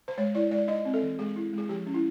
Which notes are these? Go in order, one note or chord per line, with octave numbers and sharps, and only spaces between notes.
C5
G#3 C#5
E4 D5
G#3 D5
D#4 D#5
C4
A4
E3
G#3 G#4
E4
G#3
G#4
F3 G4
C#4
E4